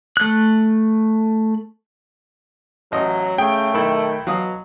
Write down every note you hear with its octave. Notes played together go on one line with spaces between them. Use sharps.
A3 F#6
A1 F#3 D#5
C#3 A3 G#4 G5
B1 D#3 E4 A4
B2 F#3 F5 D#6